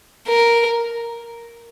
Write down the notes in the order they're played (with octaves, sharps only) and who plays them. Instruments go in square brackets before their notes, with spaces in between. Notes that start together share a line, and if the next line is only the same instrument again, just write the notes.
[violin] A#4